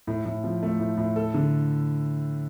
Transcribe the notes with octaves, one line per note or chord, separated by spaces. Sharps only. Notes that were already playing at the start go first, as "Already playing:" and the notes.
A2
A2
F3
A3
A2
A2
A4
D3